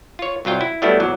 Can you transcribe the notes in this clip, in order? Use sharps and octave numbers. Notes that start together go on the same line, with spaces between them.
F4 C#5
C2 F#3 F4 G5
E4
F#3 G3 A3 B3 D4 E4
E2 G#2 F#3